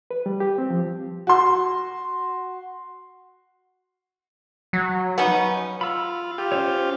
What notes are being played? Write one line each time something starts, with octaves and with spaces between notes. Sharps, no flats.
B4
G3
G4
C4
F3
F#4 C6
F#3
B3 C#4 D#4
F4 B5 E6
F4 G4
C#4 C5 C#5